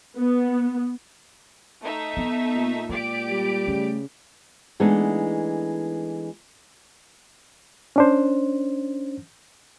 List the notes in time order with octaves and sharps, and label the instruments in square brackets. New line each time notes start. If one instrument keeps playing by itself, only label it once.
[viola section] B3
[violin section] A3 D#4 E5
[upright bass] B3
[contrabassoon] A#2
[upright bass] G#3 [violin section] G4 D5 D7
[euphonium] G3
[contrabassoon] C#3 [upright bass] A3
[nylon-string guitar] E3 G#3 A3 B3 D4 D#4
[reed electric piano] C#4 D4 C5